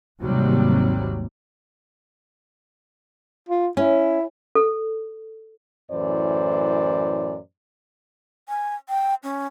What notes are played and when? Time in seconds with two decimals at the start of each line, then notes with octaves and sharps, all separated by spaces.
0.22 G#1 D#2 C3 F#3 G3
3.49 F4
3.77 C#4 E4
4.55 A4
5.90 F#2 A2 E3 C5 D5
8.49 G#5
8.89 G5
9.23 C#4